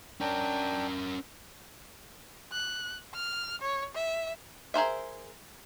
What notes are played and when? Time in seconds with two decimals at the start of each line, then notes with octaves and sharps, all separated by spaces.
0.21 C#4 D4 A#4 G5
2.52 F#6
3.14 F6
3.61 C#5
3.94 E5
4.74 G#4 A#4 C5 E5